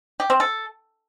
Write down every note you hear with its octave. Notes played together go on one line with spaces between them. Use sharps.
G4
C4
A4